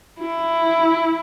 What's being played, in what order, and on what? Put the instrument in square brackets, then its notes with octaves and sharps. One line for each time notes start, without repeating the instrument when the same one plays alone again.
[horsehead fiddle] E4